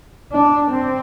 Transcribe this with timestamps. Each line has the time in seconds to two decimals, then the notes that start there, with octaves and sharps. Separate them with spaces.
0.33 D4
0.71 C4